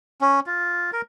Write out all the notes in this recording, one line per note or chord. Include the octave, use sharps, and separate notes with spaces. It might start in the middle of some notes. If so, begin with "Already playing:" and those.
C#4
F4
A#4